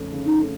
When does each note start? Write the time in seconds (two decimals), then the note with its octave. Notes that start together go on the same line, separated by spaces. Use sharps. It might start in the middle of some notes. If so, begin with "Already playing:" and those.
Already playing: F2 C#3 A3 C#4
0.12 C#3
0.26 D#4
0.41 A3